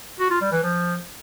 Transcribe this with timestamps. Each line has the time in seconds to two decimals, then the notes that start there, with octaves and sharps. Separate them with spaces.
0.19 F#4
0.30 F4
0.41 G3
0.52 E3
0.63 F3